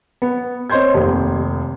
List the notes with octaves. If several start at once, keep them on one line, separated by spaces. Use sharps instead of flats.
B3
C4 C#5 D#5 C6 G6 G#6
F1 D#2